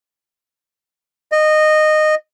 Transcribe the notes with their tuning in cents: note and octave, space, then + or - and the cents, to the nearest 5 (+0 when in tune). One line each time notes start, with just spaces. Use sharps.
D#5 -15